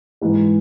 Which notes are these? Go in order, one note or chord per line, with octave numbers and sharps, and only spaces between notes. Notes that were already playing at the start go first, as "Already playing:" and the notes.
G#2 E3 G#3